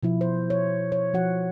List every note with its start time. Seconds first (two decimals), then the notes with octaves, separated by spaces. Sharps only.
0.03 B2 F3 E4
0.21 C5
0.50 C#5
0.92 C#5
1.14 F3 F#4 F#5